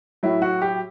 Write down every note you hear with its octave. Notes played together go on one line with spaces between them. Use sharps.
A2 F#3 E4
F#4
G4